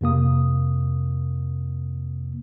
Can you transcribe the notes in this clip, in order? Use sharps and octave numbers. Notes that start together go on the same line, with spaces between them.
F2 C3 A#3 D#6